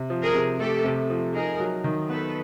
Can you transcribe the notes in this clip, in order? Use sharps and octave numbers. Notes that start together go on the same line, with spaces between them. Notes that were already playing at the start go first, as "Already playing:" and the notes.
Already playing: C3
F3
G#4 A#4
C3
A3 G4 A4
C3
F3
D#4 G#4 A#4
F#3
D#3
B3 A4 B4